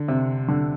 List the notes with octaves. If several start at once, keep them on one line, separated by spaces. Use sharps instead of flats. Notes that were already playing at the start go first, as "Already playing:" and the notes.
Already playing: D3
C3
D3